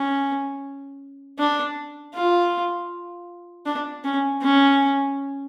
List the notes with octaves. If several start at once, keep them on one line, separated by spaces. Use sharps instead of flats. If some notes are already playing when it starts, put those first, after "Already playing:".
Already playing: C#4
D4
F4
D4
C#4
C#4